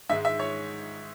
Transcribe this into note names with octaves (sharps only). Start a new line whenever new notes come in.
G#2 D#3 G#3 E5
E5
C#5